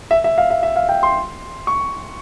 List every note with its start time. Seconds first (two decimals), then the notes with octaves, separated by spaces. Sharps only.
0.11 E5
0.24 E5
0.38 F5
0.50 E5
0.63 E5
0.76 F5
0.89 G5
1.03 C6
1.67 C#6